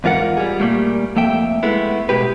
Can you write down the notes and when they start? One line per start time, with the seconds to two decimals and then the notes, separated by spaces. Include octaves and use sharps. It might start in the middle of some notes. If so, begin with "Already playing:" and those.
0.04 E2 G#2 F4 A#4 F#5
0.37 G3 G#4
0.60 A#2 G3 A3 A#3
1.16 F2 A3 A#3 E5 G5
1.63 G#3 A3 B3 E4
2.09 B2 G#3 G4 B4